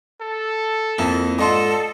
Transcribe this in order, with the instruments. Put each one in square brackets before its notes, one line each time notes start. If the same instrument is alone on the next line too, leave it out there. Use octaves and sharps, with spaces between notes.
[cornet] A4
[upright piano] F2 [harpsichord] A#3 E4
[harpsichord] G#2 D4 F4 [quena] A4 [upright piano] D#5 C6